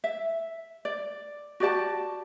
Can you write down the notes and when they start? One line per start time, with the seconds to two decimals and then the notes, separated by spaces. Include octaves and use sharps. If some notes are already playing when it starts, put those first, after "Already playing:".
0.04 E5
0.85 D5
1.60 F#4 G4 D5 A5